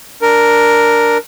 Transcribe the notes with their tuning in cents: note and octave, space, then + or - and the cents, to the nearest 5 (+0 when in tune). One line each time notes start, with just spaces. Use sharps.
D4 +0 A#4 +0